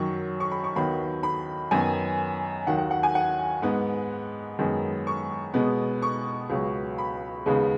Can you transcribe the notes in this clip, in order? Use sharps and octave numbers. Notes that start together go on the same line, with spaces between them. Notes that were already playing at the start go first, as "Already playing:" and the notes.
Already playing: F#2 D#3 F#3 C#6
C#6
B5
C#6
D#2 D#3 F#3 B3 B5
B5
F#2 D#3 B3 G#5
D#2 D#3 F#3 F#5
F#5
F#5
G#5
F#5
G#2 G#3 B3
F#2 D#3 G#3 B3
C#6
B2 G#3 B3
C#6
C#2 C#3 F#3 B3
B5
D#2 C#3 G#3 B3